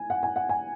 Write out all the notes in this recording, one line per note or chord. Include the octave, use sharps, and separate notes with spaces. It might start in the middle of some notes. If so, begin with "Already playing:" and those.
Already playing: G#5
F#5
G#5
F#5
G#5